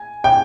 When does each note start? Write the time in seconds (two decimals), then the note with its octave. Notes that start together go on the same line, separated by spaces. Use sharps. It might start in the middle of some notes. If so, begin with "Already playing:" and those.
Already playing: G#5
0.24 G5